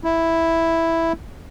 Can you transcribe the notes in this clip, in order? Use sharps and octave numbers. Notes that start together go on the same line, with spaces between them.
E4